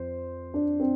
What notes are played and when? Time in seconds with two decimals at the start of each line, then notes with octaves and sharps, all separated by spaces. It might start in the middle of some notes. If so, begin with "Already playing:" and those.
Already playing: F2 C5
0.54 D4
0.80 C4